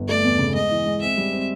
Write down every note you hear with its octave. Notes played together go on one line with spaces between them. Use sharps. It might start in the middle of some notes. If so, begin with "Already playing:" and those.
Already playing: G1
A3 D5
E2
C#3
G#3 D#5
E3
G#3
C4 E5
G3
C4